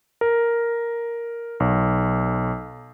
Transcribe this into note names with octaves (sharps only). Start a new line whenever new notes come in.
A#4
B1